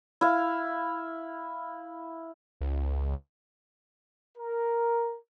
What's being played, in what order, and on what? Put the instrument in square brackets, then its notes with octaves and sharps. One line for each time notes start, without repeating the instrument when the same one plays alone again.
[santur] E4 F5
[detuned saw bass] C#2
[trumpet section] A#4